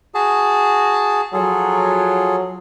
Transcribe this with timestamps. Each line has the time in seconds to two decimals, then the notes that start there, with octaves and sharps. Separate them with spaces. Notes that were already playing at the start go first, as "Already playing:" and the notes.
0.15 F#4 G#4 A5
1.33 F3 F#3 F4 G#4 A4